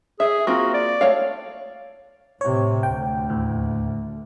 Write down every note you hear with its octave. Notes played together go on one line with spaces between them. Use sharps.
G#4 E5
A#3 C4 F4 F#4
D5
A3 C#5 F5
A2 C3 C#5
D2 G5
D#2 A2